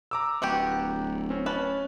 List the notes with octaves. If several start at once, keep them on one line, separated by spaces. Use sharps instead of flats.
A#5 D6 E6
D1 B3 F#4 G4
C4 C#4
C#4 B4 A5